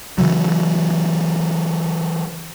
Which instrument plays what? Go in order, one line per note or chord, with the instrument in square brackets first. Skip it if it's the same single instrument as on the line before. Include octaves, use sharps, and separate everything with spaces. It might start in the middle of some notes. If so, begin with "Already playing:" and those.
[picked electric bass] C#3 E3 F#3